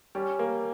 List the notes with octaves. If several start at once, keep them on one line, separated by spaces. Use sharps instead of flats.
G3 C#4
A#3